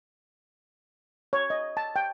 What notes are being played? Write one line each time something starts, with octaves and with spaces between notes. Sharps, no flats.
C#5
D#5
A5
G5